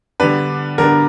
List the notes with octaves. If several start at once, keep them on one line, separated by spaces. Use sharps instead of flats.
D3 G3 B3 D4 B4
D3 G3 B3 D4 A#4